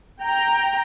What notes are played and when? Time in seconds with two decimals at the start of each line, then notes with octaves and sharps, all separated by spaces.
0.22 G5 A#5